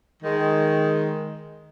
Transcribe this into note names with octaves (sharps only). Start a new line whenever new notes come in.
D#3 G#3